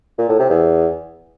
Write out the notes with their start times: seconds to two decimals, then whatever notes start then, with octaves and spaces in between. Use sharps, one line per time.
0.19 A#2
0.29 A2
0.39 C3
0.50 E2